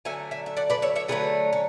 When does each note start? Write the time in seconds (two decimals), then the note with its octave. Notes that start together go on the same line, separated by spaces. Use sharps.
0.05 D3 F#3 A3 E5 G#5
0.31 E5 G#5
0.46 E5
0.57 D5 F#5
0.70 B4 D5
0.82 C#5 E5
0.96 C#5 E5
1.08 D3 F#3 A3 G#4 B4
1.53 C#4